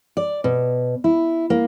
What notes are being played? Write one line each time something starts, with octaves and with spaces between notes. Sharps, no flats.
D5
B2
E4
A#3